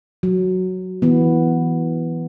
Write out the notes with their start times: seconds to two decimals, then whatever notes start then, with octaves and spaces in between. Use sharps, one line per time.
0.23 F#3
1.02 E3 B3